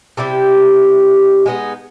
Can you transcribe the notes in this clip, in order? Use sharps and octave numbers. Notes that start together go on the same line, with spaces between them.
C3 G3 E4 G4
G#3 B3 D#4